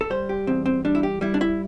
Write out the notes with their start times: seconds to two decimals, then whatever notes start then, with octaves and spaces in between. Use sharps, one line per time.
0.01 A4
0.10 G3 C5
0.29 G4
0.47 E2 C4
0.66 C4
0.85 G3 D4
0.95 E4
1.03 G4
1.21 G3 E4
1.34 D4
1.41 E4